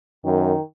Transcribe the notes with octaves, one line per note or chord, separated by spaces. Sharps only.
F#2 D#3